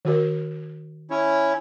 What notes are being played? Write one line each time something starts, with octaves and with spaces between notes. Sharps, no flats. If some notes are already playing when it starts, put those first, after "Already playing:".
D#3 F#4 A#4
C#4 E4 C#5